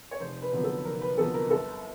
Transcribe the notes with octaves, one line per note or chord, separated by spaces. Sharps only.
C#5
F1 C5
B4
F2 D3 F#3 B3
A4
F1 A#4
B4
F2 D3 F#3 B3 A4
A#4
G1 A4